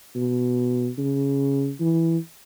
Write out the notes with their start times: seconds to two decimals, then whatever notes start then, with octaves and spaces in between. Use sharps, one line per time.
0.15 B2
0.98 C#3
1.80 E3